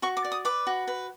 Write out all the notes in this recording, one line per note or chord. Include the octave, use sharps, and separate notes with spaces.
F#4 C#6
D6
D5
D#6
B4 D6
F#4
B4